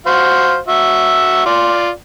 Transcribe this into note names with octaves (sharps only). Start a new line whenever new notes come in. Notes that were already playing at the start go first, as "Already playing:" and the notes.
F#4 C5 F5
F#4 E5
F4 D5